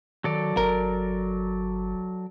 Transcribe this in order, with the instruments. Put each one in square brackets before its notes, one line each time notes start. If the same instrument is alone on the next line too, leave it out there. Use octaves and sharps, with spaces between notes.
[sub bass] D#3 [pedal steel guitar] F#3 A4 D5
[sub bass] G1 [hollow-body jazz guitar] A#4